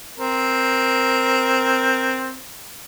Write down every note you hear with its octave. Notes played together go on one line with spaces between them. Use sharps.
C4 A#4